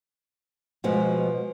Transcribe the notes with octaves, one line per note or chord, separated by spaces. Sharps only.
B2 F3 G#3 B3